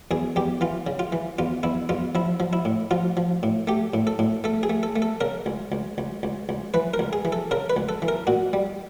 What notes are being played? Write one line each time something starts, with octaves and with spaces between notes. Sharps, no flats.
E2 G#4
E2 G4
E3 F4
C#3
F4
E3
E2 F4
E2 E4
E2 F4
F3 E4
F3
E4
A2
F3 F4
F3
A2
A3 G4
A2
A4
A2
A3 A4
G#4
A3
A4
A3
A4
C#3 A#4
C#2
C#2
C#2
C#2
C#2
E3 B4
A#4
C#2
G#4
E3
A4
C#3 A#4
B4
C#2
A4
E3
A#4
A#2 F#4
G3